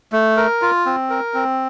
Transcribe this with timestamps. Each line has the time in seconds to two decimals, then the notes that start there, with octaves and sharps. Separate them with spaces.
0.13 A3
0.37 A#4
0.62 F4
0.86 C4
1.10 A#4
1.34 C4